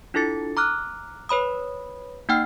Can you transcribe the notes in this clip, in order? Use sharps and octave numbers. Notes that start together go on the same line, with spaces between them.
D4 E4 F4 A4 A6 C#7
A#5 D6 F6 F#6
B4 C#5 B5 D#6
A#3 D#4 F#5 G5 F6 C7